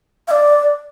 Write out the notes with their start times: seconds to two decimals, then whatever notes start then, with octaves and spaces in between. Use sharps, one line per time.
0.28 F5
0.31 D5